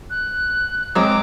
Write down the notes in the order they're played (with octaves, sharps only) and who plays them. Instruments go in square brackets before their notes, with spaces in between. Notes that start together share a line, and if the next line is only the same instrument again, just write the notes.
[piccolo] F#6
[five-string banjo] F#3 G#3 C4 [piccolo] D6